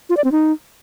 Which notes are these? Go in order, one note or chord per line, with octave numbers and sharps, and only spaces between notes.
F4
D5
C4
D#4